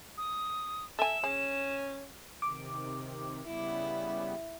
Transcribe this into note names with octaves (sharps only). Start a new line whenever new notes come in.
D#6
A4 E5 G#5 E7
C#4 G#4
C3 D#3 D6
C#3 G3 B3 E4